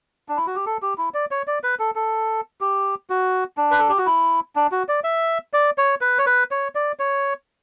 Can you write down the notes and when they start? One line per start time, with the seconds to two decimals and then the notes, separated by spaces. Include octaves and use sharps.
0.29 D4
0.37 E4
0.47 F#4
0.56 G4
0.66 A4
0.82 G4
0.98 E4
1.14 D5
1.31 C#5
1.47 D5
1.64 B4
1.79 A4
1.95 A4
2.61 G4
3.10 F#4
3.57 D4
3.71 B4
3.79 A4
3.89 G4
3.98 F#4
4.06 E4
4.56 D4
4.72 F#4
4.89 D5
5.04 E5
5.53 D5
5.78 C#5
6.01 B4
6.18 C#5
6.27 B4
6.51 C#5
6.75 D5
6.99 C#5